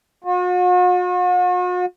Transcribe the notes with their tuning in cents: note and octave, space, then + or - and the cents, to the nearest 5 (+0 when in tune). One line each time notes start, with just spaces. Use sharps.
F#4 -45